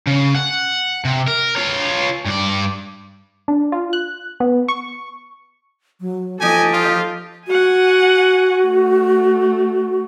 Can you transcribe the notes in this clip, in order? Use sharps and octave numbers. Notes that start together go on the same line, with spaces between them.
C#3
F#5
C3
A#4
F4 C#5
G2 D5
D4
F4
F#6
B3
C#6
F#3
F3 G4 A4 D#5 G#5
F4
F#4 F#5 G#5
A3